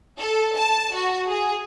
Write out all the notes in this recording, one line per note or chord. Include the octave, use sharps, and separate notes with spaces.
A4
A5
F#4
G#4